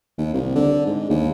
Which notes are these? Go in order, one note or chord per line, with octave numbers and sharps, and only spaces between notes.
D#2
C2
D3
G#2
D#2